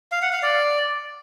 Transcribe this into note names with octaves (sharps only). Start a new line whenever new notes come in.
F5
F#5
F5
D5